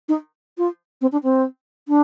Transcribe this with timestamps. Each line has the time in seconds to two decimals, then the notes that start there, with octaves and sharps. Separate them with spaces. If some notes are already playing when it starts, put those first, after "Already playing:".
0.09 D#4
0.58 F4
1.01 C4
1.12 D4
1.23 C4
1.88 D4